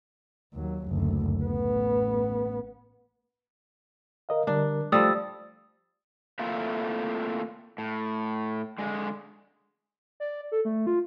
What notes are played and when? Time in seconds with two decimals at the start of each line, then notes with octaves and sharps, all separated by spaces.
0.53 D#2 F#3
0.89 F#1 D2
1.42 A1 B3
4.29 A#4 D#5 F5
4.47 D3 G3 D4 A#4
4.92 F3 G3 A3 D#6 E6 A6
6.39 A3 A#3 C4 E4 F4 A4
7.78 A2
8.78 D3 G#3
10.20 D5
10.52 A4
10.65 A3
10.87 F4